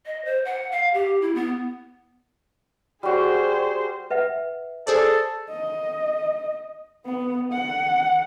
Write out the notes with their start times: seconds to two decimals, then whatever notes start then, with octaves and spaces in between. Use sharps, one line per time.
0.06 D#5
0.25 C5
0.45 F#5
0.72 F5
0.94 G4
1.22 E4
1.35 B3
3.03 G3 F#4 G#4 C5
4.10 B4 E5 F#5
4.87 G#4 A4 C5 D5
5.49 D#5
7.05 B3
7.52 F#5